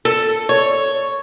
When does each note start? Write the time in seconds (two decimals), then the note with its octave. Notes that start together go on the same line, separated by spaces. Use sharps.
0.05 A4
0.49 C#5